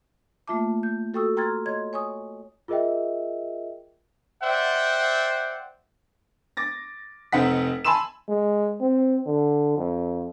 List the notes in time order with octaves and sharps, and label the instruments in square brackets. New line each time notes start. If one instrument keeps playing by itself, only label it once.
[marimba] A3 A#3 F4 E5 A5 D6
G6
F#4 A4 G5 C#6 D#6 E6
G5 A#5 C6 F6 G#6 A6
C#5 D#5 C6 G#6
C#5 G#5 C#6 D#6
[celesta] F4 G#4 A#4 D#5 E5 G5
[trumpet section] C5 D5 E5 F#5 G5
[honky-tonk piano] D6 A6 A#6
F1 C4 D#4 F#5 B6
G#5 A5 B5 C6 E6 E7
[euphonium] G#3
C4
D3
F2